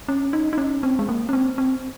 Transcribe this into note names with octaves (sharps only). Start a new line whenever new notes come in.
C#4
D#4
D#4
C#4
C4
G#3
A#3
C#4
C4
C4